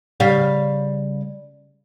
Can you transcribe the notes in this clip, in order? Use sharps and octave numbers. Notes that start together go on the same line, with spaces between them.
C#3 G3 F5